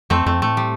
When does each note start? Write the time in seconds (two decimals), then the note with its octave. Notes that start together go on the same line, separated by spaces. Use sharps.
0.10 F2 A3 C4
0.26 F2 A3
0.42 A2 A3
0.57 G3